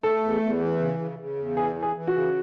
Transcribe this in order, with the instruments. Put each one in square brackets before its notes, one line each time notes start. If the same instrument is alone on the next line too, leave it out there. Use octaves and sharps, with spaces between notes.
[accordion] A3 [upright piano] A4
[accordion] E2
E2
E3
C#3
C#3
C#3
E2
[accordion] E3 [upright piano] G#4
[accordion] E3
[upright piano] G#4
[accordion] E3
[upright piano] F#4
[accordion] C#3